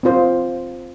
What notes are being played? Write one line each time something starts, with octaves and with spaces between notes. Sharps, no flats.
C4 F4 C5